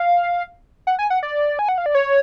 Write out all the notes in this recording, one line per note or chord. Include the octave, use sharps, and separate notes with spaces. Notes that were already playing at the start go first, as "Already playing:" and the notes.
Already playing: F5
F#5
G#5
F#5
D5
G#5
F#5
F5
D5
C#5